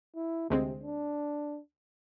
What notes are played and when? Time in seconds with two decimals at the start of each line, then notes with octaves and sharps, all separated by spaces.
0.16 E4
0.50 D2 C3 G#3 C4
0.83 D4